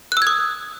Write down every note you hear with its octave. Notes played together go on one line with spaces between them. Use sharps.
D#6 E6 F#6 G#6